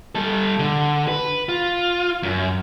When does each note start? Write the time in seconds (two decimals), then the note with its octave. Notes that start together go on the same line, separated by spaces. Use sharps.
0.15 G3 A4
0.59 D3
1.08 B4
1.49 F4
2.23 F#2